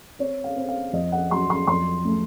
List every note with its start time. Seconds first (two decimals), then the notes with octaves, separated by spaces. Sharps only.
0.19 C4 C#5
0.44 F5
0.56 C4
0.68 F5
0.93 F2 D#5
1.12 F#5
1.31 F#3 C6
1.50 C6
1.67 F2 C6
2.05 A3